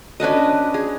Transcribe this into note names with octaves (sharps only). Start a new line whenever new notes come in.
C#4 D4 B4 D#5
G#4